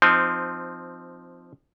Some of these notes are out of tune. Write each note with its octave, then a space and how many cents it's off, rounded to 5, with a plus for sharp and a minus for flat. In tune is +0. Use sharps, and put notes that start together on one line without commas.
F3 +0 C4 -15 D#4 +0